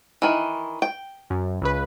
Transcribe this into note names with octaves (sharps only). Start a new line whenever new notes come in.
D#3 E3
G5
F#2
C#2 C#3 B4